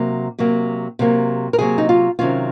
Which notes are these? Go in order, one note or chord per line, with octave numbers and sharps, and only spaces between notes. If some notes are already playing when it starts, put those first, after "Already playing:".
Already playing: C3 F#3 A#3
C3 F#3 A#3
C3 F#3 A#3
A#4
C3 F#3 A#3 G#4
D#4
F4
C3 D#3 F#3 C#4 F4